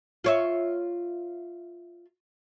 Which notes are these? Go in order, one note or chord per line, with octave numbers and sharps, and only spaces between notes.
F4 C#5 E5